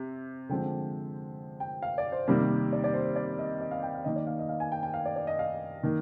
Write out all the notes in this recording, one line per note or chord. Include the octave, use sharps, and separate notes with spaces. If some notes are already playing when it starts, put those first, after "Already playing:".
Already playing: C3
D3 F3 G#3 C4 G5
G5
F5
D5
C5
C3 D#3 G3 A#3
D5
D5
C5
D5
D#5
D#5
F5
G5
F5
D#3 A#3 D#5
D5
F5
D#5
F5
G#5
G5
G5
F5
D5
D5
D#5
F5
D#3 A#3